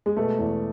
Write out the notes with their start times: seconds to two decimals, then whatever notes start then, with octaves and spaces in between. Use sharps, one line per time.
0.06 G#3
0.17 B2 A3
0.39 E2